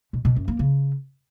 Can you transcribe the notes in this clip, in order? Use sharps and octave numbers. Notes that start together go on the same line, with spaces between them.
B2
B2
F#2
A#3
C#3